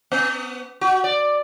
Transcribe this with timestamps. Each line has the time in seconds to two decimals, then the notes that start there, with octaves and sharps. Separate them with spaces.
0.12 B3
0.81 F#4
1.04 D5